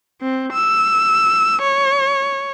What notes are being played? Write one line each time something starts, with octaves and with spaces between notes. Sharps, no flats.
C4
E6
C#5